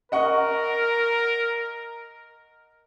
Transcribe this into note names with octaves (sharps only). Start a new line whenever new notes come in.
A#4 D#5 F#5 C#6